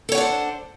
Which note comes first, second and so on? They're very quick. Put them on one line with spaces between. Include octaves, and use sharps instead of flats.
A4 C#5 F#5 D4 C5